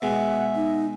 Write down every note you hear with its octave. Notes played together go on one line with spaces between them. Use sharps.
B2 G#3 E5 F#5
D#4